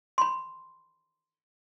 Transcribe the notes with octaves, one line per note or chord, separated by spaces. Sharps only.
B5 C6